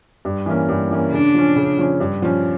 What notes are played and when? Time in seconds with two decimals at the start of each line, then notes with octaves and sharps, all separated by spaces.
0.25 G2
0.46 E3 A#3 C#4
0.69 G2
0.91 E3 A#3 C#4
1.12 C#3 D4
1.34 F3 C#4
1.56 C#3
1.78 F3 C#4
2.00 G2
2.22 F3 C#4